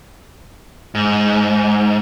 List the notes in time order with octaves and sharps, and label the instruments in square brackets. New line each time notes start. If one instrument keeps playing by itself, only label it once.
[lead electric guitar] G#2